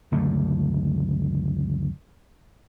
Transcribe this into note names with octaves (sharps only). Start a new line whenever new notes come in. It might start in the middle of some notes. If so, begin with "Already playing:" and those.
C#2 F#2 D3 A3